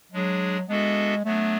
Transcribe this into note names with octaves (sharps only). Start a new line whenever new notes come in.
F#3 G#3 D4 G#4
G#3 B3 D4 F#4 A4 E5
F#3 A3 B3 D4